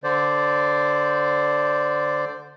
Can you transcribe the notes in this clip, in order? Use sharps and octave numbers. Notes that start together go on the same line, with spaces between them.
D3 C5 D5